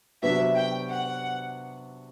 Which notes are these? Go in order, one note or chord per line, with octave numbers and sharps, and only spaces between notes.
C3 F#3 B3 D4 F#4 E5
G5
F#5